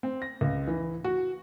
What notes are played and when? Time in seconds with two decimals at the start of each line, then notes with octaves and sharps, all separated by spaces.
0.03 C4
0.22 A#6
0.41 C#2
0.67 E3
1.04 F#4